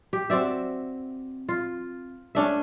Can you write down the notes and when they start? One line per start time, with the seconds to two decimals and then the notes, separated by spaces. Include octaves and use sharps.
0.13 G4
0.30 C4 F#4 D5 E5
1.49 F4
2.35 A3 C#4 D4 E5